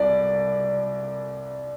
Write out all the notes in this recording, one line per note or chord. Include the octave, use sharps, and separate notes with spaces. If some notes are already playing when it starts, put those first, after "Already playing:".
Already playing: C2 D5